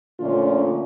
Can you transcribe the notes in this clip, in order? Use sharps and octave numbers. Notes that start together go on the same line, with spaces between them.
A#2 D3 F3 A3 C#4 F4